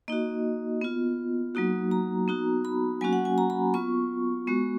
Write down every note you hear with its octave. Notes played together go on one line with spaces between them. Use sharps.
A#3 D#4 F#4 D#5
B3 F4
F#3 A#3 D#4 F#4
A#5
B3 D#4 F#4
B5
F#3 A#3 C#4 F#4 G#5
F#5
G#5
A#5
B5
B3 F4 C#6
G#3 B3 F#4